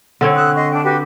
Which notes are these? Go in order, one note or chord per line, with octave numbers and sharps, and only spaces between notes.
D3 C4 C#5
D#6 E6 F#6
D#5 C6 C#6
D4 G5
F#4 G4 B4